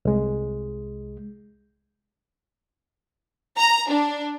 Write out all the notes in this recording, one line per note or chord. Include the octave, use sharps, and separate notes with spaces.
C2 G#3
A#5
D4